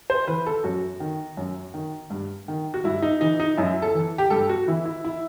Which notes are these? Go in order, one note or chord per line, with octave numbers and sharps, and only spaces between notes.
C5
E3 B4
A4
F#2 F#4
D#3
F#2
D#3
G2
D#3
F#4
G2 E4
D#4
E3 D#4
D#4
F#2 E4
A4
E3
G4
G2 A4
F#4
E3 E4
E4
E4